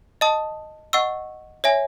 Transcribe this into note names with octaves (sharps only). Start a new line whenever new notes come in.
D#5 A5 D#6
D#5 F#5 C#6 E6
C#5 E5 G#5